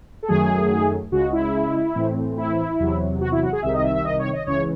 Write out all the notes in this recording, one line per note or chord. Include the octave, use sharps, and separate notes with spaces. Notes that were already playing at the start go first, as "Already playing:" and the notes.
A4
F#2 D#3 F#3 A3 G#4
C#2 C#3 G#3 F#4
E4
A2 E3 A3 C4
E4
E2 C3 F#3
F#4
E4
F#4
G#4
C2 C3 D#3 E5
D#5
E5
E5
D#5
C#5
D#5
C#2 C#3 E3 C#5